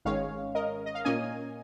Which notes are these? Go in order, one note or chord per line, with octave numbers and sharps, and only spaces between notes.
G#1 G#2 D#3 G#3 C#4 C#5 F5
A#4 D#5
D#5
F5
A#2 A#3 C#4 D#5 G#5